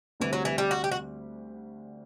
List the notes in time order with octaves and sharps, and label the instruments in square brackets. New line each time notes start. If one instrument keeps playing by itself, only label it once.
[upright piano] D2 D3 G3 C4 G4 [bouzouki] E3
[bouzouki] F#3
E3
G3
F#4
G4
F#4